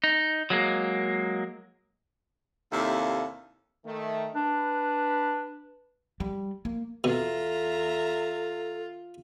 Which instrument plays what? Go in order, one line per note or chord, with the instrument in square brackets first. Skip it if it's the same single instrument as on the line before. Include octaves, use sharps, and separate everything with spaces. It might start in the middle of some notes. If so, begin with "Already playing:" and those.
[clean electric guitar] D#4
F#3 G#3 A#3
[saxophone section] D#2 C3 D4 E4 A4 F5
[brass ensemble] D#3 A3
[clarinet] D4 [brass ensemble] B4
[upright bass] G3
A#3
[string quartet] E2 E5 A#5 [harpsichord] B2 [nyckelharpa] F4 [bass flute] A4